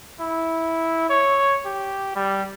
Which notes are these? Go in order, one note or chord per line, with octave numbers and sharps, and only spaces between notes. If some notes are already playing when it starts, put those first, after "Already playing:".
E4
C#5
G4
G3